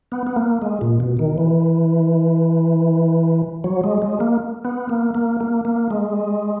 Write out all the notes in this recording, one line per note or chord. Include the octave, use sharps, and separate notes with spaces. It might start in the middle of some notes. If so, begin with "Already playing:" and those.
B3
B3
A#3
G#3
A#2
B2
D#3
E3
F#3
G#3
G#3
A#3
B3
A#3
A#3
A#3
A#3
G#3